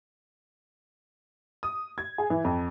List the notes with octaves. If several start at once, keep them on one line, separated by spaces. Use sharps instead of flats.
D#6
G#6
G#4
E3
F2